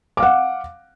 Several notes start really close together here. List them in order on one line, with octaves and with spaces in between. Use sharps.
D6 F5 F#5